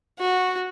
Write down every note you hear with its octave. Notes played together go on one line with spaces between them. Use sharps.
F#4